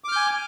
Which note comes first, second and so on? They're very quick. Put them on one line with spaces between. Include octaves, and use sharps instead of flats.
D6 F6 G6 G#5